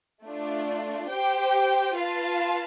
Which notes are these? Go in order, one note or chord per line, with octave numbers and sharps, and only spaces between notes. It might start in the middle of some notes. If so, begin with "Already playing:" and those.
A3 D4 F4
G4 C5 G5
F4 B4 F5 A5